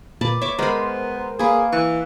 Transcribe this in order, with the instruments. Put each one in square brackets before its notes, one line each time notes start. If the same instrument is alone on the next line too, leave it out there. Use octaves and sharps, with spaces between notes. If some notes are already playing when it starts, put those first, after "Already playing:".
[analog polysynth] A#2 [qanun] B4 D5 A5
[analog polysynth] C#5 [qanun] E5 D6
[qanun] G#3 B5 [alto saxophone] B3 [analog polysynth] A#4 C5
[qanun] A#3 B4 [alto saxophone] G#4
[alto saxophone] E3 [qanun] C#6